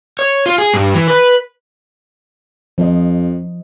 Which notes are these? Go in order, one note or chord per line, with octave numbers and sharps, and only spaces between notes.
C#5
F4
G#4
G2
E3
B4
F2 F3 D#5